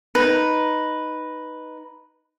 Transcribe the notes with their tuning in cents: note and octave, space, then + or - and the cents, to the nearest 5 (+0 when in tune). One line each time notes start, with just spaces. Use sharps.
D#4 +0 B4 +0